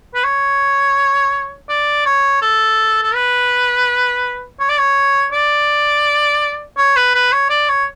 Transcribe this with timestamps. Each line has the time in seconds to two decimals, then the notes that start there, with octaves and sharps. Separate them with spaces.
0.15 B4
0.24 C#5
1.69 D5
2.06 C#5
2.42 A4
3.03 A4
3.15 B4
4.60 C#5
4.69 D5
4.78 C#5
5.32 D5
6.78 C#5
6.96 B4
7.14 B4
7.32 C#5
7.50 D5
7.69 C#5